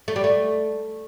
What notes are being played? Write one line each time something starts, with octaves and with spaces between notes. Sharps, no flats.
A3
G3
A3